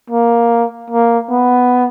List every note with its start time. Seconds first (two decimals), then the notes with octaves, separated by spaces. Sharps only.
0.10 A#3
0.90 A#3
1.30 B3